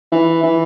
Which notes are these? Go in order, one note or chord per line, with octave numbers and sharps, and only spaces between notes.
E3
E3